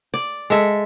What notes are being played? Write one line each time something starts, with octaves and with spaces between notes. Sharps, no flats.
D5
G#3 A4 E5